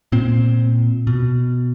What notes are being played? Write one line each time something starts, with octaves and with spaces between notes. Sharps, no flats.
A#2 C4
B2